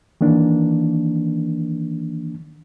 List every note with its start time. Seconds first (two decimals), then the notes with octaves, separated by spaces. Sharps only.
0.21 D#3 E3 A#3 D4